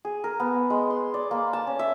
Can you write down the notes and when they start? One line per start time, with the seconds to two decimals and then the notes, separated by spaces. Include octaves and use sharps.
0.05 G#4
0.24 A#4
0.40 B3
0.70 G#3
0.90 C6
1.14 D5
1.31 A#3
1.53 A5
1.67 C#4
1.79 E5